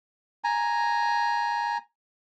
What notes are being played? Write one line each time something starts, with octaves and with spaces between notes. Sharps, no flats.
G#5 A#5